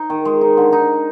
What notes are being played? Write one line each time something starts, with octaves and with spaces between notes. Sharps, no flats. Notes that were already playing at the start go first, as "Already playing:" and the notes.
Already playing: D#4
D#3
G#3
D#4
D3
D#4